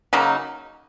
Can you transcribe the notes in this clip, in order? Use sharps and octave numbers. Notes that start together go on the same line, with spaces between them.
C#3 F#3 A#3 D#4